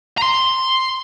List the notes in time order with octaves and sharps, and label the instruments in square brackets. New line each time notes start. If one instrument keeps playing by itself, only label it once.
[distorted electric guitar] A#5 C6